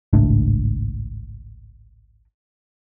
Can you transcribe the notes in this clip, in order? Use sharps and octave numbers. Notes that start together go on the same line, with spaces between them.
G#1 C#2 A2 D4